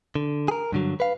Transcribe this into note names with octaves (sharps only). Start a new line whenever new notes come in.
D3
G#4 A#4
G2 D3 F#3
B4 F5